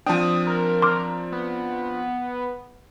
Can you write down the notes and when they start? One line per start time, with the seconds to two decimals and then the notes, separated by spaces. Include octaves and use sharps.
0.06 F3 C4 D4 G5 A5 D#6
0.47 A#4
0.82 C6 D6 F6
1.32 B3